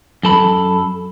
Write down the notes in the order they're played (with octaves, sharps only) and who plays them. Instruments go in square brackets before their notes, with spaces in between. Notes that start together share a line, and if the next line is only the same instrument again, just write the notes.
[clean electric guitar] F#2 A4 B5